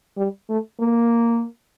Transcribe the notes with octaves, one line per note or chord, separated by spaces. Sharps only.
G3
A3
A#3